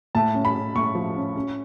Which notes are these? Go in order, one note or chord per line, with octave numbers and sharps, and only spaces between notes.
A2 A5
C#4
B5
C#4
A2 C#6
F3
C#4
C#4